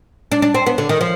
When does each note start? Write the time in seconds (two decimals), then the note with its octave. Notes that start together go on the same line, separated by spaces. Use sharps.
0.32 D4
0.42 D4
0.54 C4
0.66 B3
0.78 D3
0.89 D#3
1.01 F3